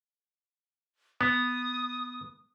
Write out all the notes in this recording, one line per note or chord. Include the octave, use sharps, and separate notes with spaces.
B3 D#6